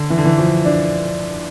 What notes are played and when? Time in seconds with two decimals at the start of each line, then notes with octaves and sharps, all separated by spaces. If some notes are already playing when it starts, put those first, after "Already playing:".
Already playing: D3
0.10 E3
0.18 D3
0.25 E3
0.38 F3
0.65 D4